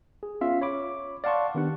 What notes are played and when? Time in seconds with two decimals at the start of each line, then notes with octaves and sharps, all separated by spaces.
0.23 G#4
0.41 B3 C#4 F4 E5 F5
0.61 C#5 B5 D6
1.24 D5 F5 F#5 A5 C6 C#6
1.55 D#3 B3 D4 G4 F#5